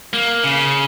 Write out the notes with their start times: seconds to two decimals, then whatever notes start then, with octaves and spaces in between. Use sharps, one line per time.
0.13 A#3
0.44 C#3